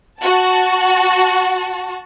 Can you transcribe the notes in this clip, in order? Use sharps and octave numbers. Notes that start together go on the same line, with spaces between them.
F#4 A5